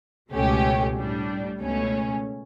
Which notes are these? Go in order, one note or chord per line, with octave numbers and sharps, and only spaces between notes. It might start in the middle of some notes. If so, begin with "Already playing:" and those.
C#2 B2 A3 C#4 G4
A2 G3 D4
C#2 B2 A3 C#4